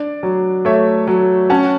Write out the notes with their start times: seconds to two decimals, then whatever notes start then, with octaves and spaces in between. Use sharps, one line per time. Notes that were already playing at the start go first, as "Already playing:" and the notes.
Already playing: D4 D5
0.23 F#3
0.65 A3 C#5 E5
1.08 F#3
1.50 C#4 F#5 A5